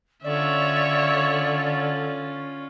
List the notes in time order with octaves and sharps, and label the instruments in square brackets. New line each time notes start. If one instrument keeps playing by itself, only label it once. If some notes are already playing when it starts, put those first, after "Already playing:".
[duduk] D3 [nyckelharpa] C#4 F4 [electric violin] C#5 E5 [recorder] D5